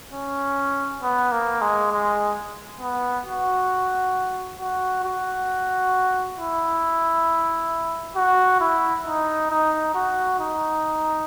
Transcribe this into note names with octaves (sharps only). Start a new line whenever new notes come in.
C#4
B3
A#3
G#3
G#3
B3
F#4
F#4
F#4
E4
F#4
E4
D#4
D#4
F#4
D#4